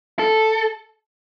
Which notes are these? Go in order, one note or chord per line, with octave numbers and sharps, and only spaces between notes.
A4